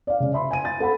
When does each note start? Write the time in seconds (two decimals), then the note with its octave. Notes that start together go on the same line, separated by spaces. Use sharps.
0.07 D5 F5
0.20 C#3
0.33 E5 B5 C6
0.51 G#5 D#7
0.65 A6
0.80 A4 F#5 B5